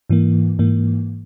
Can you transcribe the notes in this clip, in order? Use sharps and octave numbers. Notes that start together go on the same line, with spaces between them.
G#2 E3 A#3
G#2 E3 A#3